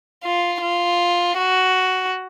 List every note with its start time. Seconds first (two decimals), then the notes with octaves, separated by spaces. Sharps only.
0.24 F4
0.62 F4
1.38 F#4